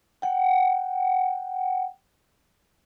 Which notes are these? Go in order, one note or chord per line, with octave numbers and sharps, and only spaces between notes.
F#5 G5